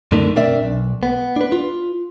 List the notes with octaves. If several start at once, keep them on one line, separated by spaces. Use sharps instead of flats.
F#2 D3 D#3 A3 D4
B2 C4 D4 A#4 D5 E5
B1
B3
D4 B4
F4